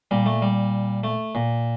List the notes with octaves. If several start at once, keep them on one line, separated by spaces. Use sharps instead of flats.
A#2 G3
A3
G3
A3
A#2